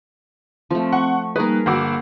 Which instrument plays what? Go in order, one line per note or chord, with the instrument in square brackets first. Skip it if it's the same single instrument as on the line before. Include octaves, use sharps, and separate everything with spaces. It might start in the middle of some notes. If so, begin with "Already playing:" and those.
[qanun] F3 A3 [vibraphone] C4
[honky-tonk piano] F#5 [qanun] C#6
[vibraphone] G3 A#3 D#4 [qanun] G#4 A#4 [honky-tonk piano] B4
[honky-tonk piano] G1 F#4 D6 [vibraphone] A#3 B5 E6